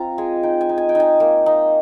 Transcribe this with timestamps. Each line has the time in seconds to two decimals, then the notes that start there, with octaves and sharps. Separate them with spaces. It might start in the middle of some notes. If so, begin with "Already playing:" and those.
Already playing: C4 F4 A#5
0.18 G#3 G#5
0.43 D#4 G5
0.61 G#5
0.69 D#4
0.78 G#5
0.89 G5
0.95 D#4 G#5
1.20 A#3
1.46 D#4